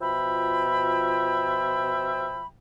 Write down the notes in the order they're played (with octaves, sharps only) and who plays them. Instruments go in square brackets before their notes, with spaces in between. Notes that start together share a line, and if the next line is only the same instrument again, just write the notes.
[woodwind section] B2 F3 F4 E5 G5 B5